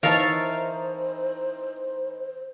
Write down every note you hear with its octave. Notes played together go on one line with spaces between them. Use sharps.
E3 D#4 A#4 C5 C#5 E5 F5 A5